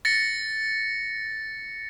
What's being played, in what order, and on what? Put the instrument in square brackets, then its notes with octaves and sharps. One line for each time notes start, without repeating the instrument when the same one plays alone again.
[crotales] A6 A#6 C#7